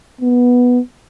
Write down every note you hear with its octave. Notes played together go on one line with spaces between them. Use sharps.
B3